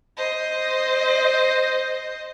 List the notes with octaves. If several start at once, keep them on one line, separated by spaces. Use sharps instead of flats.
C5 D#5